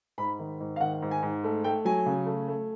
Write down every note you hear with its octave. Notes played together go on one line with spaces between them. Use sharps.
G#2 B5
D#3
G#2
F5
D#3 F#5
G#2
G#5
G#2
A3
A3 G5
F#3 G#5
C#3
A3
A3